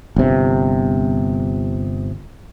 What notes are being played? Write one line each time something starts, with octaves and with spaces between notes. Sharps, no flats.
G1 C3